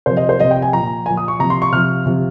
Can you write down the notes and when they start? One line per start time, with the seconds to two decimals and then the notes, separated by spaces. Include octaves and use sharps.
0.06 C3 F3 C5
0.17 D#5
0.29 C5
0.40 C3 F3 D#5
0.51 G5
0.62 G#5
0.73 A#2 F3 A#5
1.06 A#2 F3 G#5
1.17 D#6
1.28 C#6
1.39 C3 F3 A#5
1.50 C6
1.62 C#6
1.72 C3 F3 F6
2.06 C3 F3